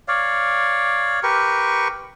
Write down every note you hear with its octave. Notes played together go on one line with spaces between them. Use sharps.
C#5 D5 F5
G4 A#4 B4 C#6